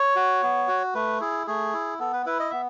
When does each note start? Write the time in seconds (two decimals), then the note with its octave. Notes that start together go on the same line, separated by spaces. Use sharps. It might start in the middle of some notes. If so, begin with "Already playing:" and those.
Already playing: C#5
0.16 F#4
0.42 B3
0.68 F#4
0.95 A3 B4
1.20 E4 G#4
1.47 A3 G#4
1.73 E4
1.99 B3 A4
2.13 B4
2.26 E4 B4
2.40 D#5
2.50 B3 E5